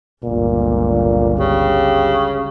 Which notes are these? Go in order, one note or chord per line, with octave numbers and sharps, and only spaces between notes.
G1 C#2 A#2
C#3 G4